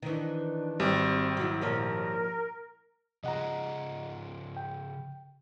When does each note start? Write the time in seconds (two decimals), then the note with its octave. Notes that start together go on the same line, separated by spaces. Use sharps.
0.02 D#3 E3 D4
0.80 G#1 G3 C4
1.37 F#3 E4
1.61 A#2 F3 A#4 C#5
3.24 C#3 F3 G#4 D#5 F#5 A#5
4.57 G5